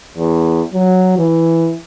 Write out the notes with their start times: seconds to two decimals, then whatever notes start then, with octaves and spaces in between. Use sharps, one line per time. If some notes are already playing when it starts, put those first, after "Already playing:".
0.17 E2
0.73 F#3
1.18 E3